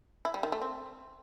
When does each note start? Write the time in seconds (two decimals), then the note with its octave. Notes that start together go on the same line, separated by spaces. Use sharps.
0.25 E4
0.34 G3
0.43 D#3
0.52 A3
0.61 C4